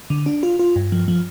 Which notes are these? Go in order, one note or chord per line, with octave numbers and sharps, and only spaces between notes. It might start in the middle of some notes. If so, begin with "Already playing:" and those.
D3
D4
F4
F4
G2
F3
F3